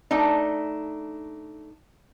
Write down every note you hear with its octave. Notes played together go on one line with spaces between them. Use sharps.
A3 D4 D#4